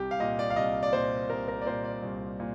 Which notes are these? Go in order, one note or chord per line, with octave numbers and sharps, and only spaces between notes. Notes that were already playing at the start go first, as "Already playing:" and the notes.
Already playing: C2 G4
F5
A#2 D#5
D5
F5
C2 D#5
D5
A#2 C5
C2 A#4
A#4
D5
A#2 C5
D5
C2
A#2